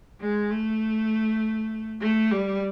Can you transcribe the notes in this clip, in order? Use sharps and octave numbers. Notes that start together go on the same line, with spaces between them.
G#3
A3
A3
G3